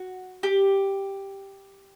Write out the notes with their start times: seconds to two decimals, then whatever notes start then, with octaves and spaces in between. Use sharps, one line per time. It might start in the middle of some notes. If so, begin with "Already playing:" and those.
Already playing: F#4
0.43 G4